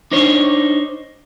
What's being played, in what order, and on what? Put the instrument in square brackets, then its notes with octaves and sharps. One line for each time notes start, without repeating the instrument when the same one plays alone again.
[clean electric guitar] D4 D#4 C5 C#5